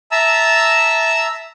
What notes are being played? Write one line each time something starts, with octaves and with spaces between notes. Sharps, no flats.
E5 A5 A#5 E6